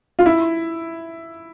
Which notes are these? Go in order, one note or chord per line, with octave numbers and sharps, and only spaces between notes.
F4
E4